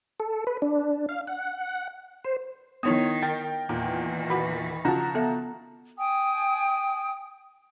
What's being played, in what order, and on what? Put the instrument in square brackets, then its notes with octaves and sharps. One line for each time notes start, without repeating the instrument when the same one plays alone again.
[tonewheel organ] A4
B4
D4
F5
F#5
C5
[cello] D#3 [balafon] B3 D#4 E4 [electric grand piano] C#5 D#6
[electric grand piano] A#4 G5 A6
[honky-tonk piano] E2 A#2 [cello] D#3 E3
[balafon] F#4 B4 F#5 [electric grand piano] B5
[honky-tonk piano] C#3 F3 F#4 [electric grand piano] A5 A#5
[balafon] B3 A4 E5
[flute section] G5 G#5 D#6